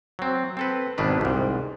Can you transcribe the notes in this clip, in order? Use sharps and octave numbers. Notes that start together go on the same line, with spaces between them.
F#3 C4
C4 A4 B4
G#1 B2 D#3 D4 B4
C2 G#2